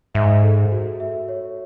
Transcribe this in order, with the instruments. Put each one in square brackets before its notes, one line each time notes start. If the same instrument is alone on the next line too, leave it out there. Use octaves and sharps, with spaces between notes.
[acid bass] G#2 [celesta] E5
[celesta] A4
F#4
E5
C#5